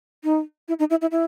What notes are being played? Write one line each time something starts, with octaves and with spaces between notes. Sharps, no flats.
D#4
E4
D#4
E4
E4
E4